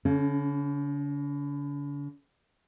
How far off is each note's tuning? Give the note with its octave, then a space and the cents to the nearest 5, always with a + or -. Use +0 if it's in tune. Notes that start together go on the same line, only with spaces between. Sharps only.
D3 -45 C#4 +0